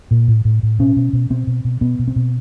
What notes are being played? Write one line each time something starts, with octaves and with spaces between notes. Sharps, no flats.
A#2
A2
A2
A2
B2 C#4
B2
B2
B2 C4
B2
B2
B2 B3
B2
C4
B2